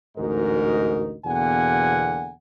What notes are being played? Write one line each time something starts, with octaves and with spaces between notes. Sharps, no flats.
A1 D2 G#2 D#4 F#4 A#4
E2 B2 D3 A#3 F#5 G#5